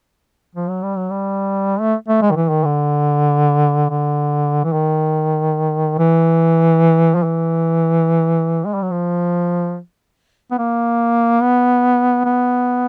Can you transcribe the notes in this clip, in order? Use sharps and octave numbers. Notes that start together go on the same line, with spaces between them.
F3
F#3
G3
F#3
G3
A3
A3
G#3
D#3
E3
D#3
D3
D3
E3
D#3
E3
F3
E3
G#3
G3
F#3
F3
B3
A#3
B3
B3